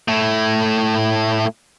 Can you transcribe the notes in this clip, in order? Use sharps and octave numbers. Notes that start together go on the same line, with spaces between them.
A2 A3